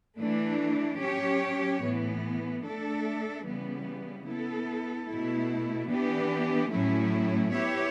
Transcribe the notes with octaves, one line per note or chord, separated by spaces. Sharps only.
E3 A3 D4
F#3 C#4 G4 C#5
A2 E3 B3
A3 D4 A4 E5
C#3 E3 G3 B3
B3 E4 A4
B2 A3 E4
E3 B3 D4 G4
A2 F#3 A3 C#4 E4
B3 E4 G4 C#5 E5